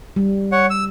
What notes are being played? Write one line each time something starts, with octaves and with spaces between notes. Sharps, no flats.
G3
C#5 F#5
E6